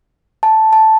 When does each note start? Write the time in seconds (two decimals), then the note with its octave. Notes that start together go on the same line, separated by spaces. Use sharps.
0.43 A5
0.73 A5